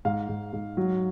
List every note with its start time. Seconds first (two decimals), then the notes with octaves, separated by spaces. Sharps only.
0.05 G#2 F5
0.29 G#2
0.53 G#2
0.77 F#3